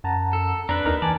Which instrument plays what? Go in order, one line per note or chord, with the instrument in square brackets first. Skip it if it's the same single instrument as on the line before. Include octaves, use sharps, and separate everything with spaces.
[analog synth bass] F#2 [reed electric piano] F#5 A5 A#5
[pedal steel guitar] A4
[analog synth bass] F2 [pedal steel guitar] D4 B4 [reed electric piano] A#5
[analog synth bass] D#2 [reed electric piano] D#4 A#4 A#5
[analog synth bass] E3 [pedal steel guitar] D5 [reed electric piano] G#5 A5